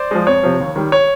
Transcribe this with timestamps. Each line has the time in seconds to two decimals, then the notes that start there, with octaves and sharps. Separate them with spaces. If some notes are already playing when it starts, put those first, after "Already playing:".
Already playing: C5 D5
0.11 F3 G#3
0.27 F2 C#5
0.43 C3 F3
0.60 D#2
0.76 D#3 G3
0.92 C#5